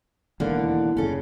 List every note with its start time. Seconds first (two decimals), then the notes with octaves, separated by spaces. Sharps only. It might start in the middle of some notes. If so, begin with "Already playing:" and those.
0.40 E1 D#2 D3 E3 A#3 B3
0.97 F#1 C#3 C#4 A4